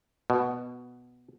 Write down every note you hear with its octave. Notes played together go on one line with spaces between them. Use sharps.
B2